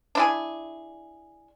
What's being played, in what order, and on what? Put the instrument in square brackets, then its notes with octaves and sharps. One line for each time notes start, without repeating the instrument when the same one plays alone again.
[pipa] D4 E4 G#4